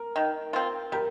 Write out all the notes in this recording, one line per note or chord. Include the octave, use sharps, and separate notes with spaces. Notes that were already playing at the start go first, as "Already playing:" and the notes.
Already playing: A#4
D#3
C4 F4
G3 A#4